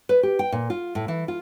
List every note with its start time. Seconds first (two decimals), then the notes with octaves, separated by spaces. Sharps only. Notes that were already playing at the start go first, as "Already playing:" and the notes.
0.09 B4
0.23 G4
0.39 G5
0.52 A#2
0.70 F4
0.95 A2
1.08 E3
1.28 F4